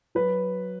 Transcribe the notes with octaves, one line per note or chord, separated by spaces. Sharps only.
F#3 B4